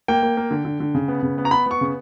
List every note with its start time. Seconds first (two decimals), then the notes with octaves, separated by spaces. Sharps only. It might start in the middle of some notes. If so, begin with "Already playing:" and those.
0.08 A#3 G5
0.23 A#3
0.37 A#3
0.51 D3
0.65 D3
0.80 D3
0.95 C#3
1.08 B3
1.23 C#3
1.38 B3
1.45 A#5
1.51 B3 B5
1.66 B3 C#6
1.81 C#3